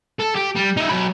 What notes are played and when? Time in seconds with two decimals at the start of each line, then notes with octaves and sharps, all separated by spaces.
0.20 A4
0.36 G4
0.56 G3
0.77 D#4 E5
0.89 F#3 B5